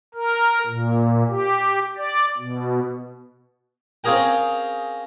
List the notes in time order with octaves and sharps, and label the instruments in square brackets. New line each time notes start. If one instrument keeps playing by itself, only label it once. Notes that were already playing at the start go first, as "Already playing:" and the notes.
[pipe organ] A#4
A#2
G4
D5
B2
[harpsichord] C4 C#4 F4 G#4 A#4 G5